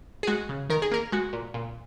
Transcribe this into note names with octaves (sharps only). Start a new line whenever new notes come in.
G#4
G#3 F#4
C#3
D#3 A#4
G#4
A#3 A#4
G#3 F#4
A#2
A#2